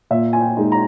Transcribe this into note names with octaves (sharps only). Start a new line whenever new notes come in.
A#2 E5
G#5
G5
G#3 D#4
A#5